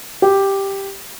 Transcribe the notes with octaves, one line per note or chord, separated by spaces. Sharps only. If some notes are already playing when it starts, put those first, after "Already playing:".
G4